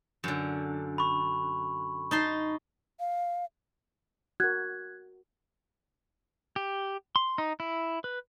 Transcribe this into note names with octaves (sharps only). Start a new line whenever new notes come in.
F#2 D3
B5 C#6
D#4 A5 C6
F5
F#4 A#4 F#6 G#6
G4
C6
D#4
E4
B4